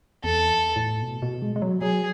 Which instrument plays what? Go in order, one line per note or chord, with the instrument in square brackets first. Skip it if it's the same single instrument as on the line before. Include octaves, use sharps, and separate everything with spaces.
[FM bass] E2 [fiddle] A4
[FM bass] A2
B2
B2
G#3
G#3
F#3
[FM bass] F#3 [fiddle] G#4